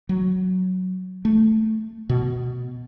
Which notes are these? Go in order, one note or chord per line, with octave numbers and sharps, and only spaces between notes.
F#3
A3
B2